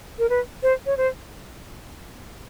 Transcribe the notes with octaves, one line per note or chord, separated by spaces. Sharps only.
A#4
B4
C5
C#5
C5